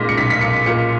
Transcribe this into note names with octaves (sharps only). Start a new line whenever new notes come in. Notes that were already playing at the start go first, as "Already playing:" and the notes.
Already playing: B1 A#2 G#3 A#6 B6
C#7
B1 B6
B6
B1 C#7
A#2 C#7